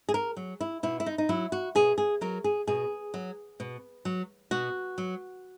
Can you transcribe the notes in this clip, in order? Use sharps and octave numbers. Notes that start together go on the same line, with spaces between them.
G#4
A#4
F#3
E4
B2 E4
E4
D#4
D#4
F#3 E4
F#4
B2 G#4
G#4
F#3 A#4
G#4
B2 G#4
F#3
B2
F#3
B2 F#4
F#3